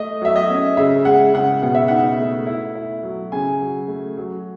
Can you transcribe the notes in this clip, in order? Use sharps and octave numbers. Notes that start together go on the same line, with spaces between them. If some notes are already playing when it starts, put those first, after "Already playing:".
Already playing: A3 D#5
F#3 E5
D#5
C#4
C#3 E5
G#3 F#5
C#3 F#5
B2 F#5
E5
D#4 F#5
A3
E4
E4
F#3
C#3 G#5
F#3
A3
F#3